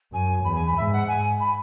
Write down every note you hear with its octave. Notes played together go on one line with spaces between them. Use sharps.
F#2 G#5
E2 B5
G#5
B5
G#2 E5
F#5
G#5
B5